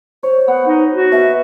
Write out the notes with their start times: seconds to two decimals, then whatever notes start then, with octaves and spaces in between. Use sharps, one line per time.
0.23 C5 C#5
0.48 B3 F#5
0.67 D#4
0.93 F#4
1.12 B2 E5